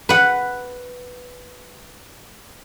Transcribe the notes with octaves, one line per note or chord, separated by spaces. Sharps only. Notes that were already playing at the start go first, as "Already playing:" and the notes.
B4 F#5